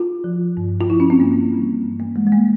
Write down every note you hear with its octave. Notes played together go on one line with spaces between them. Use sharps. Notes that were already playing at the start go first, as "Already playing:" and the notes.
Already playing: F4
F3
G2
F4
F3 E4
C#4
C4
G2 A#3
E3 G3
G2
A#3
E3 G3 G#3
G#3
A#3